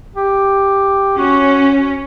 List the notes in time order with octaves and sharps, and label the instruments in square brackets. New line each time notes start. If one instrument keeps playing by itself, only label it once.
[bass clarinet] G4
[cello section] C#4 [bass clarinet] F#4